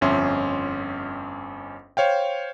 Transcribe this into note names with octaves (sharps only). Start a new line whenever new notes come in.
G1 F2 C#4 E5 C6
C5 C#5 F5 G5